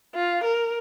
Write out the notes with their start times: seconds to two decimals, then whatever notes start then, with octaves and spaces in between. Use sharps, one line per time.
0.15 F4
0.44 A#4